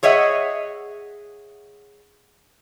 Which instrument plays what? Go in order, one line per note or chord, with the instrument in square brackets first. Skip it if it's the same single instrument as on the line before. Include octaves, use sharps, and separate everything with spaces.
[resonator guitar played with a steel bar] G#4 C#5 D#5 E5 F#5